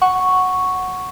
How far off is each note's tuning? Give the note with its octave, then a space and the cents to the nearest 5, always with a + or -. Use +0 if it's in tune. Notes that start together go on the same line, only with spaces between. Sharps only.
F#5 +0 C#6 +0